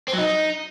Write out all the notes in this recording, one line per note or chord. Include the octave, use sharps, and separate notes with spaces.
C4
F#3
D#4